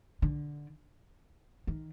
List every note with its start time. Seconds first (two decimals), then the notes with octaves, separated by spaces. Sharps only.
0.22 D3
1.67 D#3